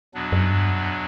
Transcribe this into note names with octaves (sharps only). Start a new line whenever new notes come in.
E2 B2 F#3 B3 D4
F#2
G2
F#2